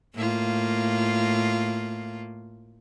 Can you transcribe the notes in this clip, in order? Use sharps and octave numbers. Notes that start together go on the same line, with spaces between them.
A2 A#3 F4